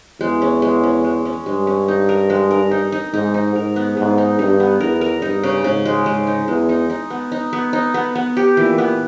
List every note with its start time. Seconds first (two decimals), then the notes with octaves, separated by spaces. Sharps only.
0.20 E2 G#3
0.42 C#4
0.62 G#3
0.83 C#4
1.04 G#3
1.25 C#4
1.45 G2 G#3
1.67 C#4
1.88 D#4
2.09 A#4
2.30 G#3
2.51 A#4
2.71 D#4
2.92 D#4
3.13 G#2 D#4
3.34 D#4
3.55 G#2 A#4
3.76 B3
3.97 G#2 B3
4.18 D#4
4.39 G2 D#4
4.60 B3
4.80 E2 A#4
5.01 A#4
5.22 G2 D#4
5.43 C#3
5.64 G#2 C#3
5.86 G#3
6.06 G#2 G#3
6.27 D#4
6.47 E2 G#3
6.69 D#4
6.90 D#4
7.10 B3
7.32 D#4
7.53 B3
7.73 D#4
7.94 B3
8.15 B3
8.37 G4
8.57 A#2 E3
8.78 B3